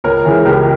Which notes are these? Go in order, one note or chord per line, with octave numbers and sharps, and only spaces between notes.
C#2 A#4 C#5
C#3 E3 G#3
C#2 G4 A#4